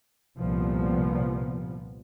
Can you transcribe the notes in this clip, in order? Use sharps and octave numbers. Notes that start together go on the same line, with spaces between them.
G1 C2 A#2 F3 G3 B3